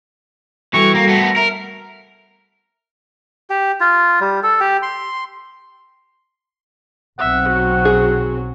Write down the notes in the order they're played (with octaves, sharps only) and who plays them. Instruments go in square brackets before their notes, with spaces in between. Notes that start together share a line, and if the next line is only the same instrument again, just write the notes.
[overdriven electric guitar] E3 [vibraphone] G3 F#4 A4 [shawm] C#6
[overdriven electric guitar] A#3 [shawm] A#5
[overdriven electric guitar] A3 B3
[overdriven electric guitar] A#4 [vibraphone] E5
[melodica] G4
F4
G3
A4
G4
C6
[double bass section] B1 C4 [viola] E5 [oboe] F#5
[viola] F#3 F#4
[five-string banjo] G#4